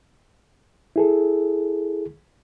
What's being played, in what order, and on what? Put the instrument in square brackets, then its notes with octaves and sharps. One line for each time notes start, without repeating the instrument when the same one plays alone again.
[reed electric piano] E4 G#4 A4